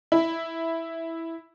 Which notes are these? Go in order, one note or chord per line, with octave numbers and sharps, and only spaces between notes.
E4